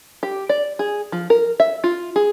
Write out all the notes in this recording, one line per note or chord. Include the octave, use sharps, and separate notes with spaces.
G4
D5
G#4
F3
A#4
E5
F4
G#4